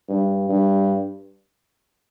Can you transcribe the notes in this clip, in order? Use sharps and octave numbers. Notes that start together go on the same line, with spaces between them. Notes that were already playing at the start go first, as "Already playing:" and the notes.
G2
G2